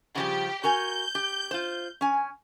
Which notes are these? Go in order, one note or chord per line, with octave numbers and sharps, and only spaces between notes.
C#3 F3 G3 G4
F#4 A#4 G#5 G6
G4
F4 C5
C#4 G#5